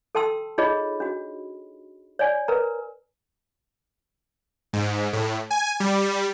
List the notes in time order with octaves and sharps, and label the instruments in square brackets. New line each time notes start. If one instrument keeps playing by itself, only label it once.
[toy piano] A4 G5 A5 C6 E6
D#4 F4 G#4 C#5 D#5 B5
D4 F#4
C#5 D5 G#5
A#4 B4 A#5
[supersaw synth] G#2
A2
G#5
G3